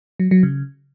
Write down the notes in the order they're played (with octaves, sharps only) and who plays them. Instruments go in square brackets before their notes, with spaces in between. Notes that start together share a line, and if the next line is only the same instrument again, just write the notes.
[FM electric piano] F#3
F#3
C#3